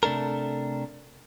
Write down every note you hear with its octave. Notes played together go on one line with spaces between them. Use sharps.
C3 A3 D4 A4 A#4